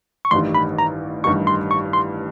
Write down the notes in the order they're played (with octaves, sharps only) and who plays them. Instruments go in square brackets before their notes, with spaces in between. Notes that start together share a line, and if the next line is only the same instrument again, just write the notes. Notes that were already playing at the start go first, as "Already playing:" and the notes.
[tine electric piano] C#6
[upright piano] A1 G2 D#3 G3 [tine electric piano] C6
[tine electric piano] B5
A#5
[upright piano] A1 G2 D#3 G3 [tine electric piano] C#6
[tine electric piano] C6
C#6
C6